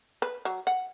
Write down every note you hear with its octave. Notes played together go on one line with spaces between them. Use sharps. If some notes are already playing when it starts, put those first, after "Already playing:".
B4
F#3
F#5